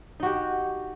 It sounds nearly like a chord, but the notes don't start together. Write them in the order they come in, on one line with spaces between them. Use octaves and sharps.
D#4 F#4 G4